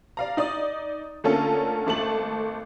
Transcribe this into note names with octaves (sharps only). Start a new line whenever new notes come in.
D5 F5 A#5
D#4 D5 D#5 D#6
D3 A3 A#3 C#4 F4 A4
G#1 A3 A5 F#7